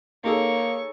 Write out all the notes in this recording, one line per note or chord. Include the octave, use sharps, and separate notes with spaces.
A#3 D#4 G#4 A4 C#5 C#6